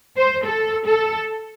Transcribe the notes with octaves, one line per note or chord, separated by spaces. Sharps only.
C5
A4
A4